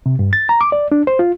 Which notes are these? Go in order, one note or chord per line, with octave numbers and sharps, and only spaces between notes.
C3
G2
A6
A#5
D6
D5
D4
C5
F4